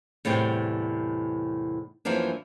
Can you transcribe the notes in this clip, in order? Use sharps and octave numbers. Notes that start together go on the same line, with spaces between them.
E2 A2 C3 G3 G5
F#2 E3 F3 A#3 D4